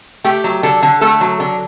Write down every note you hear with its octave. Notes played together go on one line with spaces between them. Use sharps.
A3 G4
F#3
D3 A4
D3
A3 A4
F#3
D3